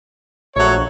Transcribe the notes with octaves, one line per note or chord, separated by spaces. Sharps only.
A#1 F#3 A3 C#5